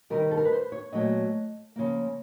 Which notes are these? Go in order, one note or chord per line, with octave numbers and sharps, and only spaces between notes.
C3 D#3 G3 A#4
A4
A#4
B4
C5
C#5
A#2 F#3 A3 D#5
C#3 F3 A#3